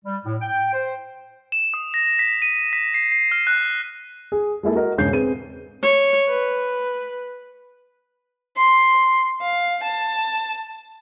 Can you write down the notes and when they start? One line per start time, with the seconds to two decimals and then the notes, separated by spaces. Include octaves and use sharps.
0.05 G3
0.25 A2
0.41 G5
0.73 C5
1.52 E7
1.74 D#6
1.94 A#6
2.19 B6
2.42 D#7
2.73 B6
2.94 C7
3.12 C7
3.32 F6
3.47 F#6
4.32 G#4
4.63 G#3 A#3 E4 A4
4.75 F#4 A#4 D#5
4.97 E1 G#2 C#3 G#4 G6 C7
5.12 C4 G#4 B4 D#7
5.82 C#5
6.29 B4
8.57 C6
9.41 F5
9.84 A5